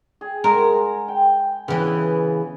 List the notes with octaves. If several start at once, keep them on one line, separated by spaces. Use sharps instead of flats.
G#4
G#3 A#4 F#5
G5
C#3 E3 B3